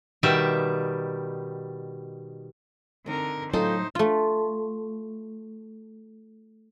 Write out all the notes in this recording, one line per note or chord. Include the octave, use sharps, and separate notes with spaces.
B2 D#3 G3 E5
D3 C4 D#4 A#4
A2 F#3 C#4 D#4 F4 A4 C5
A3 F4